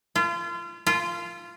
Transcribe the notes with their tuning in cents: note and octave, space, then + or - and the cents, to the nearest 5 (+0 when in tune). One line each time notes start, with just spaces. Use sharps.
F4 -30
F4 -15